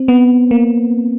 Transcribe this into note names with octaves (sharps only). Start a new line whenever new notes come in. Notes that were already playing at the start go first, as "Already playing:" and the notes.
Already playing: C4
B3
A#3